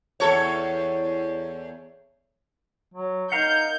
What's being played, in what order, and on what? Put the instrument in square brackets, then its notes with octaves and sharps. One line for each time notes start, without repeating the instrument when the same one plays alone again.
[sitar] E2 A4 C#5
[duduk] F#3
[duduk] D#4 [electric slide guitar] A#4 F5 F#5 [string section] G6